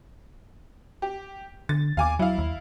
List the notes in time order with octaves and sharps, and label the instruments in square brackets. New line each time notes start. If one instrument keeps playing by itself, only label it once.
[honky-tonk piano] G4
[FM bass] D3 [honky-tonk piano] A6
[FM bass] D#2 [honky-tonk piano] F5 G#5 D6
[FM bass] F#3 [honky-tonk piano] E4 F5
[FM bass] D#2